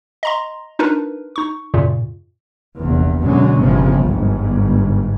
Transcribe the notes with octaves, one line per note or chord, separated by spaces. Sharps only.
D#5 A#5 C6
D4 D#4 F4 A#4 B4
D#4 C#6
F#2 A#2 C#3
F1 A#1 E2
F#2 B2 D3 F#3 G#3
G1 C#3 F3 C4
G1 G#2